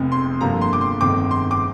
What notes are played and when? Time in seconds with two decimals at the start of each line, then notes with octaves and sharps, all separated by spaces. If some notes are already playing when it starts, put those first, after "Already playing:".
Already playing: F1 F2 C3
0.12 C6
0.41 G2 D3 F3 A#3 A#5
0.61 C6
0.73 D6
0.81 C6
1.01 G1 F2 D#3 A3 C4 D6
1.31 C6
1.51 D6